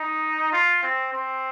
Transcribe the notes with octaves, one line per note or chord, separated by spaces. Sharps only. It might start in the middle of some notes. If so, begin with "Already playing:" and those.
Already playing: D#4
F4
C4
C4